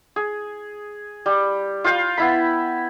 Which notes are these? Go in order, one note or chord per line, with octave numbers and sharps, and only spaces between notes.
G#4
G3
F4 F5 G5
B3 E4 B5